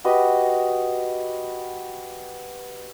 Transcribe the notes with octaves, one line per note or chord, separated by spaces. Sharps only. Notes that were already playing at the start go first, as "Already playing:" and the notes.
F#4 G4 B4 D#5